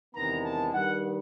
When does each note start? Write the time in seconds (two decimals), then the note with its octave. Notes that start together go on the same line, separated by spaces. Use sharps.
0.14 E2 C3 D#3 G#3 B3 A#5
0.45 A5
0.73 G2 D#3 G3 F#5